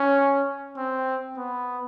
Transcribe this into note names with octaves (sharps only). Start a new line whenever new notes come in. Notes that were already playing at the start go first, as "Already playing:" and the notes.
Already playing: C#4
C4
B3